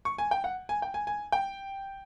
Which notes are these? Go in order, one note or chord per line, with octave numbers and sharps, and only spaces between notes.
C#6
G#5
G5
F#5
G#5
G5
G#5
G#5
G5